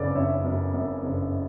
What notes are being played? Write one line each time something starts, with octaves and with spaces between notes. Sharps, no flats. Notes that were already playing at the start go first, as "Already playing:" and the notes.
Already playing: F#1 F#2 C#3 A4 B4 C#5 D5
F#1 C#5 E5
F#2
F#2
F#1